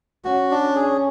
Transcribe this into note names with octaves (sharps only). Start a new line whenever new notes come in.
C#4 F#4
D4
G#4